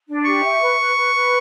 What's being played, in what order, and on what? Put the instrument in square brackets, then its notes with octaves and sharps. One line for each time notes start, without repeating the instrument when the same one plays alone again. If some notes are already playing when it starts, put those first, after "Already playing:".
[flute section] D4
[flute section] G4 [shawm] C#6
[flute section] E5
B4
B4
B4
B4